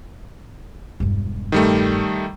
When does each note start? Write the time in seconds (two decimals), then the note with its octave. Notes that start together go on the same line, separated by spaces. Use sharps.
1.00 E1 G2
1.52 D#3 G3 A3